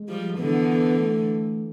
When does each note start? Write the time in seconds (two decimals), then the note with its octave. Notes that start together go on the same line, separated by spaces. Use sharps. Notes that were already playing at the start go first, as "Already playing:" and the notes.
Already playing: G#3
0.09 F3 G3
0.38 D3 E3 B3
0.99 A3